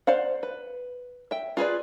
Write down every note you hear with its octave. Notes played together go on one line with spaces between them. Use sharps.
C5 D5 F5 F#5
B4
E5 G5
F4 G#4 B4 D5